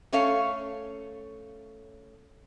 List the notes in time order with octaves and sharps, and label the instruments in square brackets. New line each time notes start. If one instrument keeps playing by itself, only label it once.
[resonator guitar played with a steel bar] A3 C#4 A4 C#5 F5